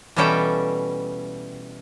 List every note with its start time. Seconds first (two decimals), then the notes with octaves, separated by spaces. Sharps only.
0.16 B2 E3 G3 C#4 A4 G5